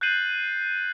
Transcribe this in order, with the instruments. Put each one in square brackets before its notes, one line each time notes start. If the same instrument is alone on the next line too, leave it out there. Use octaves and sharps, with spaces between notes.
[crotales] F#6 G6 A6 C7 D#7 F#7